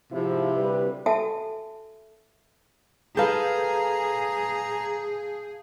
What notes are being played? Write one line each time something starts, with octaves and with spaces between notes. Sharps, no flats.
G#2 C3 F3 E4
D2 G3 B4
F#4 A4 E5 G#5 A5
G#4 A4 B4 F5 A5 A#5 G6